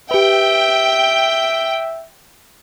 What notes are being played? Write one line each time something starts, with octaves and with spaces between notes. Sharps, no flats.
G4 B4 E5 G5